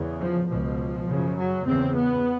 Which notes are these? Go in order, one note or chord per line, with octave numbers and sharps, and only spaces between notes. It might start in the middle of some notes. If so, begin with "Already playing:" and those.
Already playing: E2 C#3
F3
C#2 B2 F3
F#2 C#3
F#3
E2 C#3 C4
B3